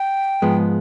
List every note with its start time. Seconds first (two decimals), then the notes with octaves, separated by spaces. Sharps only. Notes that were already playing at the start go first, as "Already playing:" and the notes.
Already playing: G5
0.42 G#2 F3 G#3 B3